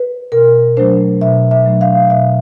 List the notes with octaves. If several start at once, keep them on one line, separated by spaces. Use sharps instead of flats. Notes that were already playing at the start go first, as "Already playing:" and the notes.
Already playing: B4
B2 A#4
F#3 A3 D4 C5
B2 E5
E5
F#3 A3 D4
F5
B2 E5